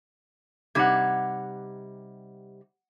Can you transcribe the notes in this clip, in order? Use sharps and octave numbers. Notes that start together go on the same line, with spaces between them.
C3 G3 D#4 F#5 G#6